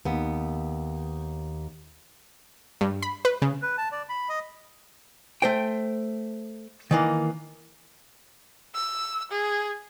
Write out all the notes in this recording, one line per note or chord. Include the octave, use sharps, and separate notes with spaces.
D#2 B3
G2
B5
B4
C#3
B4
A5
D5
B5
D#5
A3 C5 G5
D#3 E3 A#3
E6
G#4